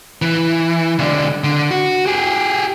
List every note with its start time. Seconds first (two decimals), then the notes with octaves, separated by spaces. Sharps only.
0.22 E3
0.99 B1 D3
1.44 D3
1.71 F#4
2.06 G4 G#4